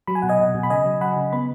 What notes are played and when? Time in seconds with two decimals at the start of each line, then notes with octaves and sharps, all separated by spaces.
0.07 F#3 B5
0.15 G#5
0.22 B2 F#5
0.29 D#5 G#5
0.39 B2
0.55 B2
0.63 B5
0.70 C#3 D#5 G#5
0.85 F#3
1.01 F#3 F#5 B5
1.17 C#3
1.33 B3 B5